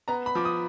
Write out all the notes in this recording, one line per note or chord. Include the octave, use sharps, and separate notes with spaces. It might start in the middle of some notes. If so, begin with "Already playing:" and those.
B3 A#5
B5
F3 D6
D#6